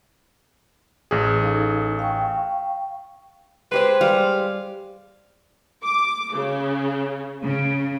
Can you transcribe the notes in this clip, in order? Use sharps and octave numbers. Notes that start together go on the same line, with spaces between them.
A1 G#4
D#4 A4 F5
F5 G5 C#6
G#3 G4 B4 C5
G3 F5
D6
C#3
C#3